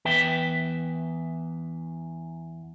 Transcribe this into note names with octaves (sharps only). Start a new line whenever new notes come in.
E2 B4 E5 G5